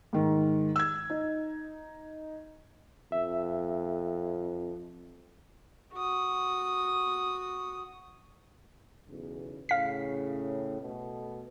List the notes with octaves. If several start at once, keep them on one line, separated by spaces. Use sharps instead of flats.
G#2 D#3
E6 G#6
D#4
F2 E5
F#4 D#6
B1 E2 C#3
A2 C#3 F5 B6
B2 A3